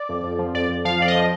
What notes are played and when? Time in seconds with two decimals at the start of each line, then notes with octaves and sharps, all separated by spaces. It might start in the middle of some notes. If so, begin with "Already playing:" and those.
Already playing: D5
0.09 F2
0.24 F2
0.39 F3
0.54 F2 D5
0.69 F2
0.85 F3 F5
1.00 F2 D5
1.08 D#5
1.15 F3